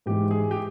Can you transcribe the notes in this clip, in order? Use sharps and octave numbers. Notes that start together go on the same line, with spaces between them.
G#2 E3 G#3 G4
G#4
G4